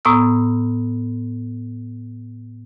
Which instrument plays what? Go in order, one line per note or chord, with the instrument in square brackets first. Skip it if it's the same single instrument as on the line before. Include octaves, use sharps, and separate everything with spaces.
[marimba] A2 B3 A#5 D#6 E6